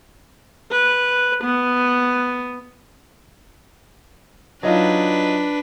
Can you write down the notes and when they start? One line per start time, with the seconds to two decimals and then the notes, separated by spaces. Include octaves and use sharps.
0.71 B4
1.44 B3
4.63 F#3 D4 D#4 F4 B4